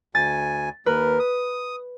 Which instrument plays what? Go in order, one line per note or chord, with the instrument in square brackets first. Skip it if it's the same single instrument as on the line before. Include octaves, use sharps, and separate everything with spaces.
[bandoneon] D2 G#5 [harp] A6
[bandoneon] D#2 A#4 [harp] B4
[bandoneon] D#6